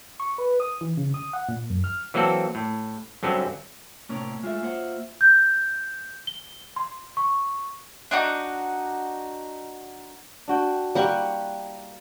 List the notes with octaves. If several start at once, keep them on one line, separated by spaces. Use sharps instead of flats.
C#6
B4
D#6
E3
C#3
D#6
F#5
A#2
F#2
F6
E3 F#3 A#3 C4 A4
A2
G2 D3 F#3 C4 C#4
A2 C3 A#3 C#4
G#3 A3 F4 E5
A#3 C5 F#5
G6
G7
C6
C#6
D4 D#4 F#4
D4 F#4 G5
G3 A#3 E4 G4 F#5 C#6